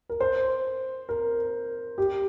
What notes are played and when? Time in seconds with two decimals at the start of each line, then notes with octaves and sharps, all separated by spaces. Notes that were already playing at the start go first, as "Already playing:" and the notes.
0.09 A#4
0.20 C5
1.09 A#4
1.98 G4